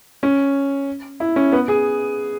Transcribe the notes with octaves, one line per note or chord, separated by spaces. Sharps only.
C#4
E4
C#4
B3
G#4